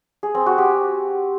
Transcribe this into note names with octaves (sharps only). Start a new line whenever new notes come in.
G#4
C4
F#4
G4